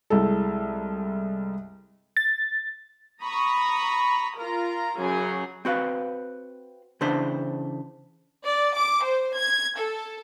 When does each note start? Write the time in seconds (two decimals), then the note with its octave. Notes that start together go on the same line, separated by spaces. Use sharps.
0.10 C2 G#3 A4
2.17 A6
3.22 A#5 B5 C#6 D#6
4.38 F4 A#4 A#5
5.00 F#2 C#3 F#3 G#4
5.65 C4 F#4 B4 F5
7.01 C#3 E3 D4 E4 C5
8.46 D5
8.76 D6
9.04 C5
9.37 G#6
9.77 A4